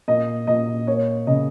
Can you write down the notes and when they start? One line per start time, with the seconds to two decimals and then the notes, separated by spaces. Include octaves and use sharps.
0.08 A#2 D#5
0.47 A#2 D#5
0.87 A#3 C#5
1.27 C#3 D#5